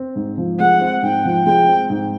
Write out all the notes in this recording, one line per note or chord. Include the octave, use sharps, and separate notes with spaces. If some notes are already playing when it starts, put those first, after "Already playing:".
Already playing: C4
G#2
F3
G#3 F#5
C4
G#2 G5
F3
G#3 G5
C4
G#2